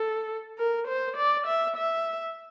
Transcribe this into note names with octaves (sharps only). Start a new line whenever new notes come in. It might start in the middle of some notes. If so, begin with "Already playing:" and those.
Already playing: A4
A#4
C5
D5
E5
E5